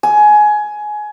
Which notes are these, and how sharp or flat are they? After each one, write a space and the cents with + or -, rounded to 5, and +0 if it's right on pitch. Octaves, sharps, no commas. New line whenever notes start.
G#5 +20